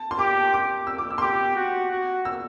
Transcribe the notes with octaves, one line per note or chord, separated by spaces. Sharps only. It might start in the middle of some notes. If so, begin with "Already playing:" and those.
Already playing: A5
C6
G4 D6
D6
E6
D6
E6
C6
G4 D6
F#4
F#4
E6